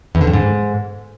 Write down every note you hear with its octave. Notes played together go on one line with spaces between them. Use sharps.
E2
D3
F2
G#2